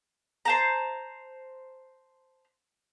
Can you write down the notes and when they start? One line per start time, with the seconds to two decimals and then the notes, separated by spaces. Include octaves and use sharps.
0.45 C5 A5 A#5